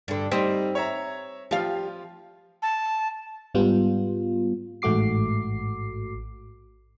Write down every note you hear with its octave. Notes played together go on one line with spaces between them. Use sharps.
G2 D3
G3 C4 D#4 B6
C#5 E5 A#5
F3 G3 F4 F5
A5
G#2 G3 B3 F4
A1 G#2 A3 F#4 D6 C7